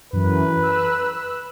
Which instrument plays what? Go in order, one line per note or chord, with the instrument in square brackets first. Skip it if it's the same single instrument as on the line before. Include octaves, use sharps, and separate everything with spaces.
[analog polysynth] F#2 E3 [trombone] B4
[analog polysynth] E6 F#6